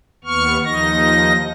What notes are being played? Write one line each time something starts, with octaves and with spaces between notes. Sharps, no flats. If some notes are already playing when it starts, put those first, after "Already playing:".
D#2 B3 C#6 F6
D#2 F3 D#4 D#5 A#6